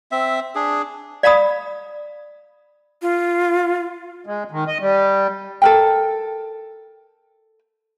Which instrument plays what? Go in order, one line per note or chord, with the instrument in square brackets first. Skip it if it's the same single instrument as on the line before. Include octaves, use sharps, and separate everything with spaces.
[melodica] C4 E5
D4 G#4
[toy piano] D5 F5 A#5 B5 D#6
[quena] F4
[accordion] G#3
D#3
D#5
G3
[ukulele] A4 A#4 G5